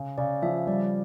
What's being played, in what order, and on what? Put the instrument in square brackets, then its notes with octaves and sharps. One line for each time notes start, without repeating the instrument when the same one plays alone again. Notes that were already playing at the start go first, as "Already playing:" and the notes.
Already playing: [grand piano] C#3
[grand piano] C#3 [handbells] D5
[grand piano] F3 [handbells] E5
[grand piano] G3 [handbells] D5